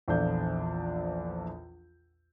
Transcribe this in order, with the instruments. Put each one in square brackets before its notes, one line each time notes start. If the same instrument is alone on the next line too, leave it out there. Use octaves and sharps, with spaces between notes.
[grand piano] A#1 E2 F3 D4 A4 G6